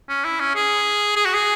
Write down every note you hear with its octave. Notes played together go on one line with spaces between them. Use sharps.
C#4
E4
C#4
G#4
G#4
F#4
G#4